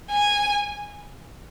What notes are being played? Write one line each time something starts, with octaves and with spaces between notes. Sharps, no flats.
G#5